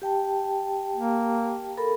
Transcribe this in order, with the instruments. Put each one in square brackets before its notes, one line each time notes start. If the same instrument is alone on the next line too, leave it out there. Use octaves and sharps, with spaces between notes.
[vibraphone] G4 G5 A5
[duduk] A#3
[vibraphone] A4 A#4 B5